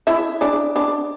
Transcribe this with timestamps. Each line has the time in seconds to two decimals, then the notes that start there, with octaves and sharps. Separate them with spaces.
0.07 E4 E5
0.41 D4 D5
0.76 D4 D5